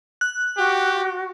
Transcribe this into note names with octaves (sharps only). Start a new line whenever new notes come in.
F#6
F#4 G4